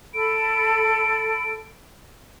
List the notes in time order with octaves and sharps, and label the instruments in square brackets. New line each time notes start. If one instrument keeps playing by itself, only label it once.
[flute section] A4 B5 [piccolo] D7